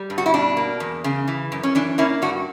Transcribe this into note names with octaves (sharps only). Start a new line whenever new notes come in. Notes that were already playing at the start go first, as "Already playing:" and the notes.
Already playing: G3
G2
F#4
E4
B2 D4
A#3
E2
C#3
E3
F#2
C#4
E3 D4
A#3 C#4 E4
G2 D4 F#4